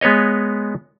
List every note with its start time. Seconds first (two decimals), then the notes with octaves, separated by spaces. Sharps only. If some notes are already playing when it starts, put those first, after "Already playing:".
0.01 G#3 B3 B4 C#5 D#5